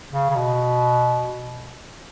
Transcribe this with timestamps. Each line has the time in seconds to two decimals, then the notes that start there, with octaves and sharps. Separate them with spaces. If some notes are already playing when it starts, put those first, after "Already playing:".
0.14 C#3
0.30 C#3
0.36 B2